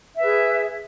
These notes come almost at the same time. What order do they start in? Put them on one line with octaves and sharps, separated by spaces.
E5 B4 G#4